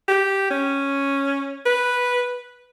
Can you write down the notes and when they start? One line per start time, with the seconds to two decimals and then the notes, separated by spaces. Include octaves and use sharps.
0.08 G4
0.50 C#4
1.66 B4